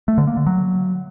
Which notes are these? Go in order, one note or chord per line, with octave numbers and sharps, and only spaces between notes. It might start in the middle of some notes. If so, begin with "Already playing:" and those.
A3
D3
A#3
D3
F#3